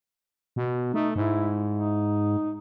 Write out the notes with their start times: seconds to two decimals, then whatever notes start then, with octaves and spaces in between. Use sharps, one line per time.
0.56 B2
0.94 A3 D#4
1.16 G#2 E4
1.73 D#4